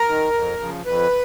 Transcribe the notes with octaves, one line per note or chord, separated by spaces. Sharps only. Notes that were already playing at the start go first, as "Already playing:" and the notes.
Already playing: A#4
D#3
F2
C#3 F3
F2 B4